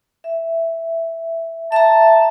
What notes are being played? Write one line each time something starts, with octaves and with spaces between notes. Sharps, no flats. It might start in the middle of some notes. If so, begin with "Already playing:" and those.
E5
E5 A5 A#5